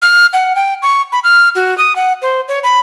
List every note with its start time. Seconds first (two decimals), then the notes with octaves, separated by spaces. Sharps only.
0.02 F6
0.33 F#5
0.55 G5
0.82 C#6
1.12 B5
1.24 F6
1.55 F#4
1.78 D#6
1.96 F#5
2.22 C5
2.48 C#5
2.63 B5